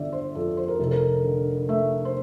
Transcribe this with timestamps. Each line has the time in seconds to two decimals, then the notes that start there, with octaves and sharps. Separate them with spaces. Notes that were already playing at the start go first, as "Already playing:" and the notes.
Already playing: G1 D3 D5 E5
0.13 C5
0.35 F2 A4
0.57 C5
0.68 A#4
0.79 F1 A4
0.91 A#4
1.24 D3
1.69 A3 E5
2.05 C5